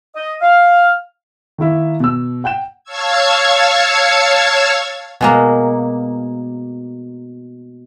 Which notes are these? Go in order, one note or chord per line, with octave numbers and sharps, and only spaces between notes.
D#5
F5
D#3 A#3 E4 E5
B2 E6
F#5 G5 G6 E7
C#5 F5 A5 C#6 E6 G#6
B2 G#3 A#3